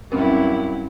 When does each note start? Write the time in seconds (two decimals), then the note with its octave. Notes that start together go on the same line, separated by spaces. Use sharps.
0.12 G2 F#3 C4 C#4 E4 A#4